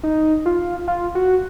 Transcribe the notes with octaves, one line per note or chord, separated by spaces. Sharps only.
D#4
F4
F4
F#4